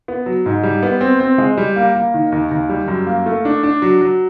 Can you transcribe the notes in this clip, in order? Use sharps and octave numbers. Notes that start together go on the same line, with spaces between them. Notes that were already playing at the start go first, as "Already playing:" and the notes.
B3
F#3
G#2
G3
B3
C4
C4
G#3
G3
A#3
A#3
D#3
D#2
D#2
G3
F#2
A#3
A3
D4
D4
F#3
F#3